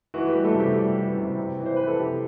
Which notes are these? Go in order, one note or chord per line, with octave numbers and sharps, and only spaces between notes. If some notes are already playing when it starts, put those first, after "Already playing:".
E3 F#4
G4
G3
A3 A4
C3
G4
G3
E3
C3
C3
E3
C5
E3 B4
A4
C3 G4